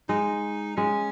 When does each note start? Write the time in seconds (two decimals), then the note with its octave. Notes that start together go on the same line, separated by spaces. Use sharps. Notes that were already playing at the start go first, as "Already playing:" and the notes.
0.09 G#3 D#4
0.77 G#3 C#4